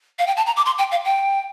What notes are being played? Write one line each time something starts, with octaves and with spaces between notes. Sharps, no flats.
F5
G5
A5
A#5
D6
C6
G5
F5
G5